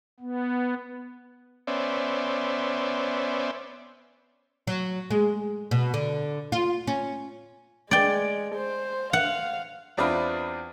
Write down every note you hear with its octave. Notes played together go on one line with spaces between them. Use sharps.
B3
B3 C#4 C5 D5 E5
F#3
G#3
B2
D3
F4
C#4
G#3 D5 G5
C5
F5 F#5
E2 C4 D4 E4 F4 B4